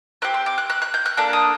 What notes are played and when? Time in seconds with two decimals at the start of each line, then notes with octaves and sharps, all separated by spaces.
0.22 C4 G4 F#6
0.34 C6
0.46 D6
0.58 F#6
0.70 F#6
0.82 F#6
0.94 G6
1.06 F#6
1.17 A#3 D4 A4 F#6
1.33 D#6